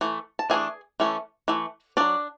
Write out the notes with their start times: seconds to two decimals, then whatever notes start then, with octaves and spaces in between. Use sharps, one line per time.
0.01 E3 A3
0.39 A5
0.50 E3 A3 D4 G#4 G#5
1.00 E3 A3 C#4
1.48 E3 A3
1.97 F#3 C#4 D4 D5